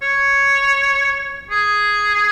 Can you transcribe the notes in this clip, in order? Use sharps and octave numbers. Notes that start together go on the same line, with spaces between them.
C#5
G#4